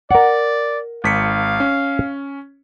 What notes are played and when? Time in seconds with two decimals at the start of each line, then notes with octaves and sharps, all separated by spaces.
0.11 A#4 D5 F#5
1.04 G#1 F5 B6 C#7
1.60 C#4